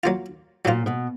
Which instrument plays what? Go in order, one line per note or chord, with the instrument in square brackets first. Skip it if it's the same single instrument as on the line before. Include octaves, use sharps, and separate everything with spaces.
[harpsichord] F#3 A#3 F4
[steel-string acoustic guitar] A#2 [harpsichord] F#3 A#3 F4
[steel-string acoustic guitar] B2